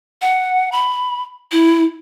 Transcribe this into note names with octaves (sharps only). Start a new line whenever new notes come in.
F#5
B5
E4